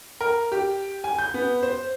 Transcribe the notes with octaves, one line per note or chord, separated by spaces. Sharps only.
A#4
G4
G#5
G6
B3
C5